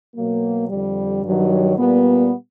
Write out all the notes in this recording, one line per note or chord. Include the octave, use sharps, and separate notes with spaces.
B2 F#3 A#3
F2 D3 G3
G2 D#3 F#3
A#2 G3 B3